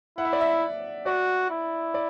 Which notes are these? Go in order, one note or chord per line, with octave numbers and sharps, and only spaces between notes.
E4 F#5
E5
D5
E5
F#4 D5
E4
D5